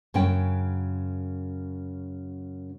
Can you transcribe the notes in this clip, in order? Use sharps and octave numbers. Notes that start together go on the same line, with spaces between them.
F#2 C#3 C#4 G5